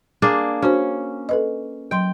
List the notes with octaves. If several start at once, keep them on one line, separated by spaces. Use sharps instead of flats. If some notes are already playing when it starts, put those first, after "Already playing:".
A#3 D4 G#4
C#4 D4 F#4 C5
A4 B4 D#5
F#3 G5 C6